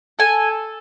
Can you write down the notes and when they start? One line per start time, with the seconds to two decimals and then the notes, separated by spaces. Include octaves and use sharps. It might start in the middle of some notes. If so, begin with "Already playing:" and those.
0.19 A4 G#5